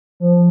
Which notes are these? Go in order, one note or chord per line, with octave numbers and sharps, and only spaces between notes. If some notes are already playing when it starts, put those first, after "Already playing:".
F3